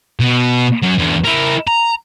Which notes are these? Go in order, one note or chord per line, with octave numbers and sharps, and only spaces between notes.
B2
F#3 C#4
E2 D3
E4 A#4
A#5